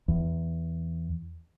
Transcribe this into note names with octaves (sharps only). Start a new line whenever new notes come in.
E2